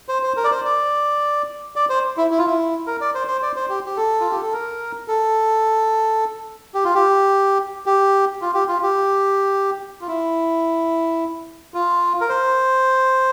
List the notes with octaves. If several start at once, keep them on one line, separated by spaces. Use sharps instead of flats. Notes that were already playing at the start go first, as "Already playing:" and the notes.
C5
C5
A#4
D5
C5
D5
D5
C5
E4
E4
F4
E4
A#4
D5
C5
C5
D5
C5
G4
G4
A4
F4
G4
A4
A#4
A4
G4
F4
G4
G4
F4
G4
F4
G4
F4
E4
F4
A#4
C5